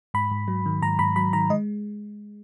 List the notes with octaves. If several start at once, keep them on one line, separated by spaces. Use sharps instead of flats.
G#2 B5
G#2
F#3
D#3
G#2 A#5
G#2 B5
F#3 B5
D#3 A#5
G#3 D#5